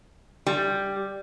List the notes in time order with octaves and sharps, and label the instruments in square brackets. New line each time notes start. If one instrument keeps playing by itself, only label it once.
[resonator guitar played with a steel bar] G3